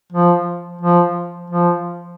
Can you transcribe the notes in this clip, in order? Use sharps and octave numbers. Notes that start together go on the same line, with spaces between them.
F3
F3
F3